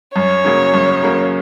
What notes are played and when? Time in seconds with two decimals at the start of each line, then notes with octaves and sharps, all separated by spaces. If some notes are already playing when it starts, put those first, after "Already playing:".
0.15 F#2 C#5
0.45 C#3 F#3 A#3
0.74 F#2
1.03 C#3 F#3 A#3